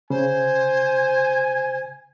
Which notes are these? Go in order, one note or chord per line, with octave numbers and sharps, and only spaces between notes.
C#3 C5 G#5